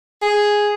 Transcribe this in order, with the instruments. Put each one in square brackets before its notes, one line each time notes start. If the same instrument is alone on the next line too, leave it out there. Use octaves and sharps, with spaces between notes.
[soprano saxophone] G#4